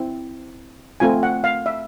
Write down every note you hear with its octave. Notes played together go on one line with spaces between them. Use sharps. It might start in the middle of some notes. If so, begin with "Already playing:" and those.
Already playing: C4 E4
A3 C4 F4 G#5
F#5
F5
E5